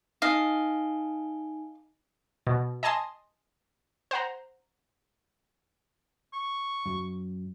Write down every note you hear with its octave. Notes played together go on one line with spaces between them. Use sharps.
D#4 D#5 F5 G#5
B2
D#5 G#5 A5 C6 D#6
C5 F#5 A#5
C#6
F#2 F#3